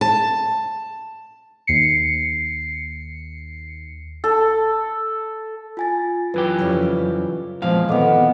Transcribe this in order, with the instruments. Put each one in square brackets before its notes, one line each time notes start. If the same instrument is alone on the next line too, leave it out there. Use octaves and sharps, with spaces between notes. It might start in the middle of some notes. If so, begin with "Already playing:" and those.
[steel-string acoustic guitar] A5
[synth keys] D#2 C7 C#7
[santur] A4
[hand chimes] F4 G#5 A6
[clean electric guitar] F#2 E3 G4 [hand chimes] F4 B4
[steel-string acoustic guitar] F2 C#3 G3
[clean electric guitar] E2 F5 [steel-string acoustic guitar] A#2 G#3 [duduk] F3 [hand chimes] C4
[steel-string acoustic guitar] A#2 D#3 [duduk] B3 [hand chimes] A4 D#5 D6